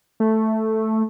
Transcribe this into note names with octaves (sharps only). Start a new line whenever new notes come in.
A3